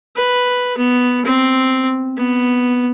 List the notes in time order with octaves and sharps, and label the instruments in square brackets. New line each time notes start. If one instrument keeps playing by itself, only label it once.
[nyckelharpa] B4
B3
C4
B3